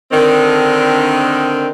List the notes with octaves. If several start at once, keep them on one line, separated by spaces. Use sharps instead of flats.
D3 D#3 C4